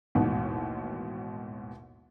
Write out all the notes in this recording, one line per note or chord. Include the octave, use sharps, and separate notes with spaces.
A1 D#2 G#2 B2